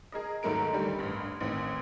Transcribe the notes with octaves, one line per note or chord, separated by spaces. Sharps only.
G#4 A#4 D#5
D#2 G#2 F#3 A3 A#4 D7
D2 D#3 G3 G4
A1 G2
A1 D#2 C4